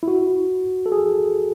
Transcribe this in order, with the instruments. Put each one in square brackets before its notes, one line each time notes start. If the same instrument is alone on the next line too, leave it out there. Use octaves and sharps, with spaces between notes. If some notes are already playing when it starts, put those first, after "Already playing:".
[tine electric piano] E4
F#4
A4
G#4